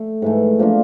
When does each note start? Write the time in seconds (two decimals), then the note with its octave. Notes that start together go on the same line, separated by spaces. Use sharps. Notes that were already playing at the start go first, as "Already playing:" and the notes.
Already playing: A3
0.22 G#2 E3 A3
0.59 F3 A#3 D4 F4